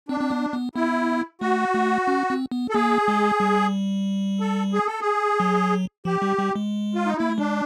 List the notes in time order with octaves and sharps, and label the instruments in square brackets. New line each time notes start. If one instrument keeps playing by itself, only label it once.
[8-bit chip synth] C4 [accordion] D4
[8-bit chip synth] C4
B3
B3
[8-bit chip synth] B3 [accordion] E4
[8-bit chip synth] A3 [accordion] F#4
[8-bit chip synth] A3
C#4
C4
B3
[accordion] A4
[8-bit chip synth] A#3 [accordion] G#4
[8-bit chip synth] G#3
G3
[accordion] A4
G#4
A4
G#4
[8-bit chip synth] F#3
[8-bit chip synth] F3 [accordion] G4
[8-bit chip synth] G3
G3
G#3
[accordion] F4
D#4
[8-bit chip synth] A#3 [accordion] E4
[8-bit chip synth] A3
[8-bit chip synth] G#3 [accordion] D4